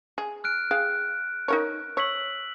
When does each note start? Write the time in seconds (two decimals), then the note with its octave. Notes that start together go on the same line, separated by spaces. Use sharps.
0.18 G#4
0.44 F6 F#6 D7
0.71 G#4 F5 G5 F#6
1.48 D#4 A#4 C#5
1.97 C#5 E6 B6 F#7